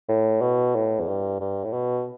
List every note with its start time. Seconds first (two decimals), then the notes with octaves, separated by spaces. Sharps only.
0.09 A2
0.42 B2
0.76 A2
1.00 E2
1.08 G2
1.40 G2
1.65 A2
1.73 B2